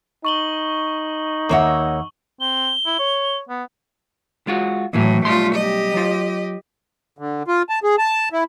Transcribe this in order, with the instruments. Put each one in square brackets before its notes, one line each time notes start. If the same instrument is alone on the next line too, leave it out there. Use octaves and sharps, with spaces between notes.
[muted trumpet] D#4 [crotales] C#6 F#7 G7
[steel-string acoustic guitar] D#2 F#5 [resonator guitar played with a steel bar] A#3 C#5 E5
[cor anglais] C4 [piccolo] G7
[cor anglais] E4
C#5
B3
[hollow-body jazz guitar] G#3 F4 F#4
[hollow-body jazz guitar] D#2 E3 F#3 [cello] A2
[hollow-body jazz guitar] B1 G3 C6 [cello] A3 F4
[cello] G4 D#5
[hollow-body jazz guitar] F#3 F4
[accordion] D3
F4
A5
G#4
A5
E4